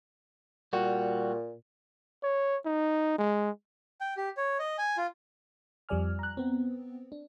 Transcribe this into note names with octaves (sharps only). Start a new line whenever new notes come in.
A#2 G3 F#4
C#5
D#4
G#3
G5
G4
C#5
D#5
G#5
F4
F2 F3 G3 D5 G#5 F6
A#5 F#6
B3 C4
D4